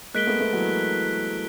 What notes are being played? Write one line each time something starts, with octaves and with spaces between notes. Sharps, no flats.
G#3 A#3 F#6 B6 D7 G7
A3 B3
A3 B3
E3 F#3